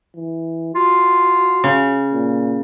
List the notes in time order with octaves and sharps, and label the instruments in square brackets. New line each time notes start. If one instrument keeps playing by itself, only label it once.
[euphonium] E3
[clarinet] F4 [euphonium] F#4
[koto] C#3
[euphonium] A#2